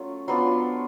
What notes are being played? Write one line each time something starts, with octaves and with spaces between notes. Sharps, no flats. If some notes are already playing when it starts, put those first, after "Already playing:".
Already playing: F#3 A3 C#4 F4
F#3 B3 D4 F4 C6